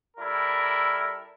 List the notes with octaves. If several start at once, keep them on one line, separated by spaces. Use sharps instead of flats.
G3 E4 A4 A#4